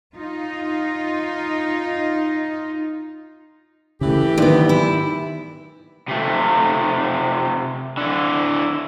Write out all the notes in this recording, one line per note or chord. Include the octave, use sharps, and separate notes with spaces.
D#4 F4
C#3 E3 A3 G4
D2 D#3 B3
E4
C3 A3
D3 E4